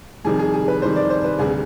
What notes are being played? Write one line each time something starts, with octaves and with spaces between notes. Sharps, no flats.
F2 C3 D#3 G3 G#4
G#4
G#4
B4
F2 C3 D#3 G3 C5
D5
C5
B4
D2 C3 G3 G#4